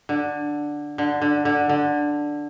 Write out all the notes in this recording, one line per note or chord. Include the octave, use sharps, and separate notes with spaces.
D3
D3
D3
D3
D3